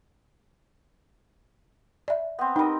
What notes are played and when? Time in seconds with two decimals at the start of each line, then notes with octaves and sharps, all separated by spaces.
2.08 D5 E5
2.39 B3 C4
2.56 D#4 G4 A#4 D#5 B5